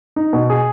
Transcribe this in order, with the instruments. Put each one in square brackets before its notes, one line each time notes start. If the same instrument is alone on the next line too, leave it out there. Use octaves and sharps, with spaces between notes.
[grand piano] D#4
B2
G#4